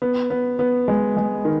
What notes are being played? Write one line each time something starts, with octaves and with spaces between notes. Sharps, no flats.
B3
B3
B3
G#3
G#3
D#3